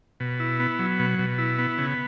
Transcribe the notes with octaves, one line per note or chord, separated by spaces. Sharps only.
B2
E4
B3
F#3
B2
B2
E4
B3
C#3